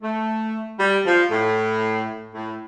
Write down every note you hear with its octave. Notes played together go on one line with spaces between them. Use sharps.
A3
G3
F3
A2
A2